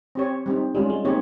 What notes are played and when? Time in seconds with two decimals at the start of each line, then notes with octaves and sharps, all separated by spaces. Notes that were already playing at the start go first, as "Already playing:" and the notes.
0.15 C4 G4 C#5
0.46 G3 C4 D#4
0.75 G3 G#3 C#4 F4
0.90 G#3
1.05 A#3 C4 D#4 G4 C#5